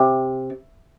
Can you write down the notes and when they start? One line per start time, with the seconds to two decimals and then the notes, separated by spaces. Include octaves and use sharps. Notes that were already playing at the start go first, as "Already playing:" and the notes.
Already playing: C3